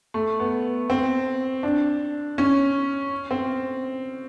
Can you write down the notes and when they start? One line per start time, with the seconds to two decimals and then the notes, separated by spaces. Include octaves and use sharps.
0.14 A3
0.39 B3
0.90 C4
1.63 D4
2.38 C#4
3.31 C4